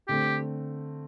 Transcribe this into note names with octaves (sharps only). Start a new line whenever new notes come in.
D3 A3 C4 G4